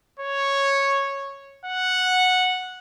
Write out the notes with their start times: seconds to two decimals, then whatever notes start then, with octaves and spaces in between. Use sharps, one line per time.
0.19 C#5
1.65 F#5